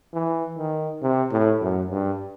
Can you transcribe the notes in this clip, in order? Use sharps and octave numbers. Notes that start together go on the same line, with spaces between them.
E3
D#3
C3
A2
F#2
G2